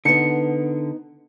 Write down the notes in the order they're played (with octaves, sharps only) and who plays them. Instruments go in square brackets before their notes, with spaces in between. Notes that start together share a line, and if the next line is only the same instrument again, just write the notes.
[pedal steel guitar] D3 [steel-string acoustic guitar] B3 D#4 [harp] C#7